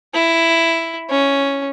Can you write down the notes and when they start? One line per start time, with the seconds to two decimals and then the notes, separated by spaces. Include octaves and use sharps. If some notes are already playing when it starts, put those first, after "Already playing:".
0.14 E4
1.10 C#4